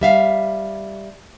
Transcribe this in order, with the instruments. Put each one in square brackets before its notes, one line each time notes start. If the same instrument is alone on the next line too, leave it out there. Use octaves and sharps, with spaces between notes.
[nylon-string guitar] G3 E5 F5